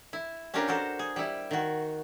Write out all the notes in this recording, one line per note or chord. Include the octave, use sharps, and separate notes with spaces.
E4
C#4 D4 F4 G4 A#4 C5
F#4 A4 A#4 C5
G#4
G3 E4
D#3 F#4